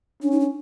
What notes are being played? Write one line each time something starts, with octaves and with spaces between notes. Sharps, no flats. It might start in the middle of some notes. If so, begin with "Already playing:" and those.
C#4 D4
D#4
D4